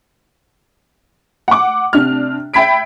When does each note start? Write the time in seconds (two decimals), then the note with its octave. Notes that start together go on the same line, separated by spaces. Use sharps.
1.48 F#5 D6
1.93 C3 D4 F6
2.54 E5 G5 B5 G#6 B6 D7